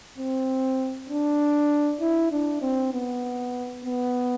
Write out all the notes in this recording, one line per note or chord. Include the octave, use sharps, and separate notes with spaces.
C4
D4
E4
D4
C4
B3
B3